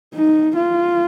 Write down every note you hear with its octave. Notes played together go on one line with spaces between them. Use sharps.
D#4
F4